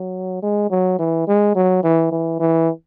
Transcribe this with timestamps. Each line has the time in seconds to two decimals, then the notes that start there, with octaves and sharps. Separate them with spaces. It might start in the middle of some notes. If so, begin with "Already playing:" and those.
Already playing: F#3
0.43 G#3
0.71 F#3
0.99 E3
1.28 G#3
1.56 F#3
1.84 E3
2.12 E3
2.40 E3